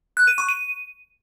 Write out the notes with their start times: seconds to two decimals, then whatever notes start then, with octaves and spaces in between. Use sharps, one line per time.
0.17 F#6
0.27 D#7
0.38 C#6
0.49 D#7